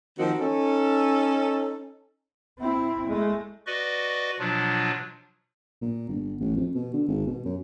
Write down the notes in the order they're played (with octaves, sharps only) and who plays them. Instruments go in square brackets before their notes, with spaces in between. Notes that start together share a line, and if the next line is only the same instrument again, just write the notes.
[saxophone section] D#3 F3 A#3 C4 D#4 F#4
C#4 D#4 A4
[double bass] C4 E4
G#3 A3
[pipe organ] F#4 B4 D5 D#5 C#6
B2 F3 F#3 D4 F4
[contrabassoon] A#2
G1
A1
F2
B2
D3
G#1
B2
F#2